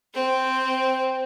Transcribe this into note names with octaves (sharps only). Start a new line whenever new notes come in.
C4